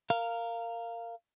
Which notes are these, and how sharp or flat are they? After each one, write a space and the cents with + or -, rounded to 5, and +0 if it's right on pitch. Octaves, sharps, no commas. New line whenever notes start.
A#4 -15 F5 -5